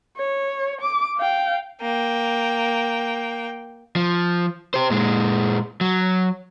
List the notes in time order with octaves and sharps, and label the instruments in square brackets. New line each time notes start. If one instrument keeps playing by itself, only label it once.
[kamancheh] C#5
D6
F5 G5
[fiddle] A#3 G5
[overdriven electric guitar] F3
G4 C5
A#2 G#3
F#3